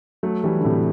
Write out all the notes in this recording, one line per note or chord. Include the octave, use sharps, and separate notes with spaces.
F#3 A3
E3 G3
D3
A2 C3